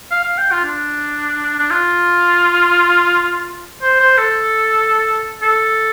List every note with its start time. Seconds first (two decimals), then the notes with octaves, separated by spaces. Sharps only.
0.11 F5
0.24 F5
0.38 G5
0.51 F4
0.64 D4
1.59 D4
1.71 F4
3.82 C5
4.00 C5
4.17 A4
5.42 A4